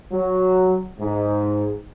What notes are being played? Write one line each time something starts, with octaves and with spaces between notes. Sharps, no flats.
F#3
G#2